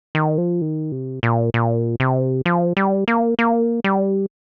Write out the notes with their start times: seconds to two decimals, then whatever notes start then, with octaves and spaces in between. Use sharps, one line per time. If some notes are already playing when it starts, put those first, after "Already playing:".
0.15 D#3
0.38 F3
0.61 D#3
0.92 C3
1.23 A#2
1.54 A#2
2.00 C3
2.45 F3
2.77 G3
3.08 A#3
3.39 A#3
3.84 G3